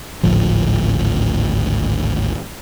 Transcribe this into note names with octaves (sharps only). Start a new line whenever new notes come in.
G#1 D2 A2 F3